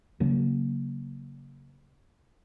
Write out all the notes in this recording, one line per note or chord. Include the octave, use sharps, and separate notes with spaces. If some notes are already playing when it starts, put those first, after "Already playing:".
C#3 F#3 A#3